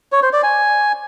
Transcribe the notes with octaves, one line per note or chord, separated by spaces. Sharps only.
C#5
C5
D5
G#5